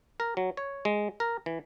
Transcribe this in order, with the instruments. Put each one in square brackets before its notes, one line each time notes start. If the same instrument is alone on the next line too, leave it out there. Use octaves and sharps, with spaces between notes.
[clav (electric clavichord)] A#4
F#3
C#5
G#3
A#4
E3